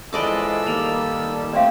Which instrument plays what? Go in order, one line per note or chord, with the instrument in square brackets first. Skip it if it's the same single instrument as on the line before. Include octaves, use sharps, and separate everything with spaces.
[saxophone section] E3 F3 G#3 [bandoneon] A4 E6 [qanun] D5 D#5 D6
[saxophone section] D#3 G3 [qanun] A#3
[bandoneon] A3 C4 [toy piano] D5 F5